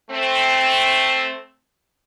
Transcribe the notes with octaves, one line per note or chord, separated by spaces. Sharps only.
A3 C4